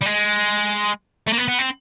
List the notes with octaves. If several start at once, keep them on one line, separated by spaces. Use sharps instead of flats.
G3
G#3
A3
A#3
B3
B3
C4